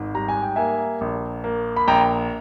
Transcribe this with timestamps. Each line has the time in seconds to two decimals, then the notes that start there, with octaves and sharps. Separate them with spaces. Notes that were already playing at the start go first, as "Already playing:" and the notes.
Already playing: G#1 G#2
0.14 G3 A#5
0.29 G#5
0.42 G5
0.56 A#3 E5 G#5
1.01 A#1
1.44 A#3
1.76 B5
1.87 A#1 G5 A#5